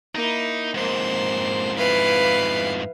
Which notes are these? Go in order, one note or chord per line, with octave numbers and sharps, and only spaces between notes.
A#3 D#4 E4
F2 G#2 A#3 C5
E4 B4 F5